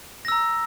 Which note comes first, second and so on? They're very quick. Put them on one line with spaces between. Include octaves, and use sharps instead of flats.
A#6 E6 A#5